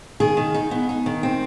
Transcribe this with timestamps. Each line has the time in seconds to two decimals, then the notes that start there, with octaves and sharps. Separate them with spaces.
0.20 D#3 G#4
0.37 D#3
0.54 D#4
0.71 B3
0.89 D#4
1.06 D#3
1.23 C4